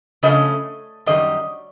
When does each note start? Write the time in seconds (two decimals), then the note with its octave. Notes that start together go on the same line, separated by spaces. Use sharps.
0.23 C#3 F3 A3 C#4 D#5
1.06 F#2 D#3 G3 D#5